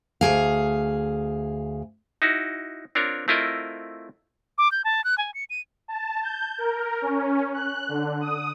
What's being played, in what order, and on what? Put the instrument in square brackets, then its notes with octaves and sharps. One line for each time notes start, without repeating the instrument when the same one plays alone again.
[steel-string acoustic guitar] D2 E3 G#4 F5
[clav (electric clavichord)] D#4 E4 F#4
C4 D4 F4 A#4 C#5
A3 C4 E4 F4 A#4 D#5
[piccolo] D6
G6
A5
F#6
G#5
C#7
D#7
[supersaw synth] A5
G6
A#4
C#4
F#6
D3
D#6